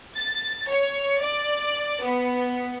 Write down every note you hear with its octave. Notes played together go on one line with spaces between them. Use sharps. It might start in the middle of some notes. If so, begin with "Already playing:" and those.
A6
C#5
D5
B3